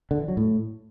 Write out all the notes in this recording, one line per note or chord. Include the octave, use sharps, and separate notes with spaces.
D3
E3
F#3
A2